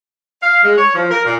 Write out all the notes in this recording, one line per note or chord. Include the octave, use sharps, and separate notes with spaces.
F5
G#3
C#5
F3
A#4
A#2